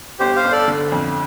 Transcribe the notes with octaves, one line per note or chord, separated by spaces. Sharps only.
G1 G4 C5
C5 F5
G1
A4 D5
D3
F2